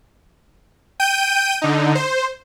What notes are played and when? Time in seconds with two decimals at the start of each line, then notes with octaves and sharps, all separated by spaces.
1.00 G5 G6 D#7
1.62 D3 D#4
1.95 C5